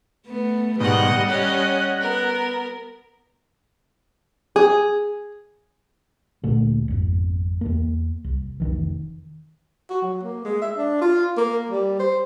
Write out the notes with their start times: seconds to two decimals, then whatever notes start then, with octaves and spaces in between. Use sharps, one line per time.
0.26 A3 B3
0.80 G#2 B2 D#3 G3 D#5 F#5
1.27 C#4 D#5 F#5
2.00 B3 A#4
4.56 G#4
6.43 D2 A#2 A3 A#3
6.88 G#1 F2
7.61 E2 A#3
8.24 C2
8.60 F1 D#3 E3
9.90 F#4
10.02 F#3
10.23 A#3
10.44 G#3
10.61 E5
10.76 D4
11.01 F4
11.37 A#3
11.70 G3
11.99 C5